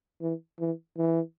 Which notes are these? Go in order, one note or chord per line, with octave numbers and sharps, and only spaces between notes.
E3
E3
E3